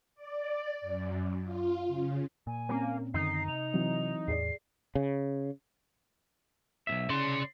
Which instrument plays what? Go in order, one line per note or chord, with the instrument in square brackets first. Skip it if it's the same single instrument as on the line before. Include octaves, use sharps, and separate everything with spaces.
[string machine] D5
F#2
F4
C#3
[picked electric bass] A#2 [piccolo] G#5
[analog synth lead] A#3 [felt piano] C4 C#4
[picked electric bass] F#2 D3 D#3 [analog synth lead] D#4 [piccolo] C7
[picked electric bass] C3 [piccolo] F7
[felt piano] E3 F#3 C4
[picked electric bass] E2 A2 [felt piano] G#4 D5 [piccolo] C7
[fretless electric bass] C#3
[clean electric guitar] B1 B2 E5
[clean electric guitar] C#3 [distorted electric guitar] D5 C6